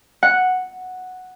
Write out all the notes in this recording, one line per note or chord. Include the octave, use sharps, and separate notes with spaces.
F#5